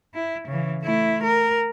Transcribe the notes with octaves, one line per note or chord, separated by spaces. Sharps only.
E4
C#3 E3
A3 E4
A#4